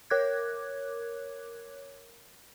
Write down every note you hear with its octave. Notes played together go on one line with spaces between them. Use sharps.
A#4 C#5 D6 F#6 G#6